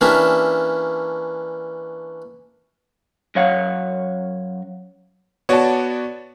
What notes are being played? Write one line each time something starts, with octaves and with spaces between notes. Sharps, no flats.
E3 A#3 C#4 D4 G4 E5
F#2 F#3 C#5 F5 F#5
B3 F#4 C#5 D5 A5